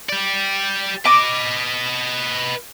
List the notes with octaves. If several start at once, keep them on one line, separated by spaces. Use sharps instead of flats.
G4 D5
B4 D#5 D6